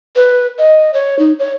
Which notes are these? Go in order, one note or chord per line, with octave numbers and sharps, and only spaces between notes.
B4
D#5
C#5
D#4
C#5